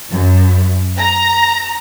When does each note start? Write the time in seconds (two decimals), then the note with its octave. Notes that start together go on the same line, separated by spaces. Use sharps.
0.11 F#2
0.97 A#5